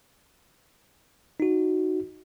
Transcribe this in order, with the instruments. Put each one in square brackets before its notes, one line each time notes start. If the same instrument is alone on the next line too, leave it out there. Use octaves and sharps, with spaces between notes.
[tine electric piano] D#4 F#4